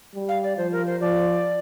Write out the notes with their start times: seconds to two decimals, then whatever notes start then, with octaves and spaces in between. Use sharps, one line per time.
0.14 G3
0.28 F5
0.43 D5
0.57 F3 C5
0.72 A#4
0.86 C5
1.01 F3 D5